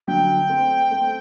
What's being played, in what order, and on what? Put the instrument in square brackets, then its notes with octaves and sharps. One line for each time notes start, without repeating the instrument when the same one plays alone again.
[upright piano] D3 F#3 [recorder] G5
[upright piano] A3 C4
A3 C4